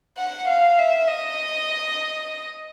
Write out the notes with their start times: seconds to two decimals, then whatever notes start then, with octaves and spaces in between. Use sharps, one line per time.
0.18 F#5
0.48 F5
0.78 E5
1.08 D#5